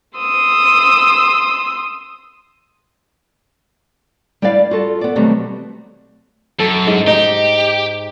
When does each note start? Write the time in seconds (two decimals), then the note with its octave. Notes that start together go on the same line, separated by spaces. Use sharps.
0.18 C6 D#6 E6
4.42 G3 E4 B4 D5 F5
4.71 F4 F#4 A4
5.01 B3 D5
5.16 B2 D#3 F#3 G3 A3 C4
6.60 F#2 A4
6.87 G#2
7.07 D#4 G4